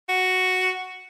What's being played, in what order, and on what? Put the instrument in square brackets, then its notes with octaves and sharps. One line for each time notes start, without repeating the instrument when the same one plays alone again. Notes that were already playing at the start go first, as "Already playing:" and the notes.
[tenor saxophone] F#4